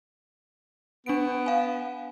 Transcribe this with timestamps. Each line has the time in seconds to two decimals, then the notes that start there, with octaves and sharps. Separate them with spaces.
1.06 B3 D4 D7
1.46 F5 G#5